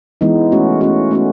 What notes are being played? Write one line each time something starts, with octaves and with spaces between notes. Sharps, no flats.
E3 G#3 B3 D#4
A3 C#4 F#4
A3 C#4 F#4
A3 C#4 F#4